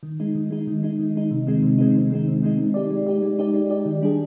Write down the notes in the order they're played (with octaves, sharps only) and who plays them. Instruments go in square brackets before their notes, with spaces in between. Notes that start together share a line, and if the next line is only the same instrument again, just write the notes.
[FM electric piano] D#3
G#3 D#4
D#3
G#3 D#4
D#3
G#3 D#4
D#3
G#3 D#4
C3
D#3 G#3 C4 D#4
C3
D#3 G#3 C4 D#4
C3
D#3 G#3 C4 D#4
C3
D#3 G#3 C4 D#4
G#3
D#4 G4 D5
G#3
D#4 G4 D5
G#3
D#4 G4 D5
G#3
D#4 G4 D5
D#3
G3 D4 G#4